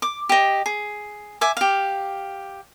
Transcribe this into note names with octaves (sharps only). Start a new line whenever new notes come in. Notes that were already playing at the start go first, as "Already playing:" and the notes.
D6
G4 D#5
G#4
E5 G#5 D6
G4 F5